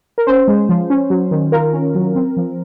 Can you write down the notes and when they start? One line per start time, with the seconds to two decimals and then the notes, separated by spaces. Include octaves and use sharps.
0.18 A#4
0.27 C#4 C5
0.48 G#3
0.69 F3
0.90 C#4
1.10 F#3
1.31 D#3
1.52 F4 A#4
1.73 C#4
1.95 F#3
2.15 C4
2.37 F3